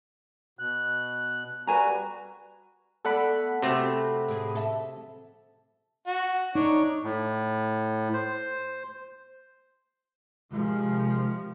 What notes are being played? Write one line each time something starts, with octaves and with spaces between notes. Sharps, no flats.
B2 F#6
G3 F#4 B4 G#5 A#5
A3 B3 A4 D5 F#5 B5
C3 A3 C4 F#4
A2 G#4
A4 E5
F#4
D4 D#4 C#5
A2
C5
C3 D#3 F3 G#3